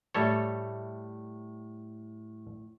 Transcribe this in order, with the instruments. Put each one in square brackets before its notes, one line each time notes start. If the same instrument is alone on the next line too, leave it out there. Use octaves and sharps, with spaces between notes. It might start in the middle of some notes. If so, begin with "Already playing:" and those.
[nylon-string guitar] A2 E5 [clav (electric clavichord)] G3 A4 C#5